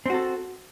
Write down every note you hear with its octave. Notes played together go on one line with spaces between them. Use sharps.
C4 F#4 A4